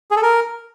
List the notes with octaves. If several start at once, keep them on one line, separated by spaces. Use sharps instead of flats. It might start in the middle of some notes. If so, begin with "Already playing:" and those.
G#4
A4
A#4